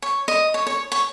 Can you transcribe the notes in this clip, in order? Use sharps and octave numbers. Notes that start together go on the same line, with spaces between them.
C#5
D#5
C#5
C#5
C#5